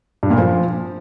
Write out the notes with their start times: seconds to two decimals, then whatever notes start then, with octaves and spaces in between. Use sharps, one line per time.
0.23 G2
0.31 A#2
0.38 F3